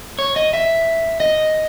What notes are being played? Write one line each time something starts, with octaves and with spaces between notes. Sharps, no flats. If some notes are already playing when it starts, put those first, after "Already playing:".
C#5
D#5
E5
D#5